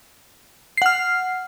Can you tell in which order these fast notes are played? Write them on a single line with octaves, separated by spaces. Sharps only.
C7 F#5 F6